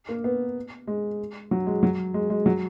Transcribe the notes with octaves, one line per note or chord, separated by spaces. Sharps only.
A#3
B3
G#3
F#3
G#3
F#3
G#3
G#3
F#3